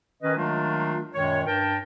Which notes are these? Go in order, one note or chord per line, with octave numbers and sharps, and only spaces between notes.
D#3 C#4 B4 D#5
D#3 F#3 G#3 A3 D4 F4
F#2 A#2 D#3 G#3 C#5
G2 A#4 G5 A5